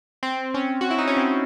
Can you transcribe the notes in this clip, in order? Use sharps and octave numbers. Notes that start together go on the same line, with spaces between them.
C4
C#4
F#4
E4
D#4
C#4
C4